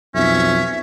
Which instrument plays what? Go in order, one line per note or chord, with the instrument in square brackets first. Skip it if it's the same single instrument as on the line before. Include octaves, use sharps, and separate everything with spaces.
[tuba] B1 [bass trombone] F2 [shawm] C#4 [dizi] E5